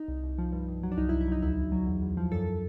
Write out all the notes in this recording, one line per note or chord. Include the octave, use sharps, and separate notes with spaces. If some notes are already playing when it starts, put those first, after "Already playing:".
Already playing: D#4
C2
C2
F3
G2
G2
F#3
D4
C2 D#4
E4
C2
E4
F#3 D#4
D2 E4
D2
F#3
E2
E2
F3
F#2 A4